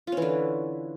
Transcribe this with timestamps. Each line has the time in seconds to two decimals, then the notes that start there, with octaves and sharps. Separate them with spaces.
0.07 F4
0.12 C#4
0.17 E3
0.22 D3